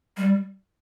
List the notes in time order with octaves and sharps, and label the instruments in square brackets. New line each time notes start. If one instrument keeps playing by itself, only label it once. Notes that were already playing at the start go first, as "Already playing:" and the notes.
[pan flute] G3